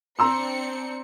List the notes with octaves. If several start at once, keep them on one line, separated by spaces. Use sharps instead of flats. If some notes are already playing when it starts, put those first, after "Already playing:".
C4 D4 A#5 C6 E6 C#7